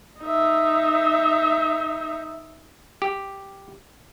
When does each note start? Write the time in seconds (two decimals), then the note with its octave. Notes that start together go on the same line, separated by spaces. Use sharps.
0.21 D#4 E5
3.02 G4